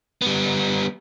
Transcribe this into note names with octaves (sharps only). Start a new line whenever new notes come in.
G3 B3